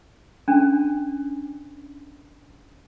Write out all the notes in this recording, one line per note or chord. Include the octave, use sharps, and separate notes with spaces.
C#4 D4